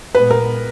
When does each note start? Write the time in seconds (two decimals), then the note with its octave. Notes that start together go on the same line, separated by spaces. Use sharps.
0.15 A#2 G#3 B3 B4
0.31 A#4